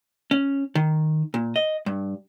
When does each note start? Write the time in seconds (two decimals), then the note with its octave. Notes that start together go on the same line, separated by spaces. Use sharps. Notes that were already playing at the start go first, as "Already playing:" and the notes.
0.31 C#4
0.75 D#3
1.34 A#2
1.56 D#5
1.86 G2